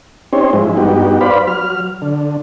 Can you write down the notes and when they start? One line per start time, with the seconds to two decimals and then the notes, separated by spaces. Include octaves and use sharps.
0.33 C4 C#4 D#4 G4 C5 C#5
0.53 G#2 F3 G#3 E4
0.77 G2 B3 D#4 F#4 G4
1.21 B4 C5 D5 F5 B5
1.48 F#3 F6
2.02 D3